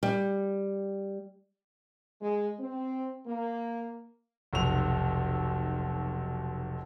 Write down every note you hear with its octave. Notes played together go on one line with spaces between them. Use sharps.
G3
G#3
C4
A#3
F1 B1 F7